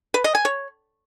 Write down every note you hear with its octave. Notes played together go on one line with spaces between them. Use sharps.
B4
D#5
G#5
C#5